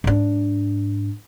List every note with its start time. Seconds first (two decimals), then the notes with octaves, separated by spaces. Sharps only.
0.04 G#2 D4